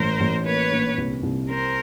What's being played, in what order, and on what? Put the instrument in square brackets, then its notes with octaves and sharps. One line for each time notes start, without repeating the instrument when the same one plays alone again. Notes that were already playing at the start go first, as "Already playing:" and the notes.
Already playing: [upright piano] A1 [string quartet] A#4 C5
[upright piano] A1
[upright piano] A#3 [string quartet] B4 C#5
[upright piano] A#1
C2
C2
[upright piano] C4 [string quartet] A#4 C5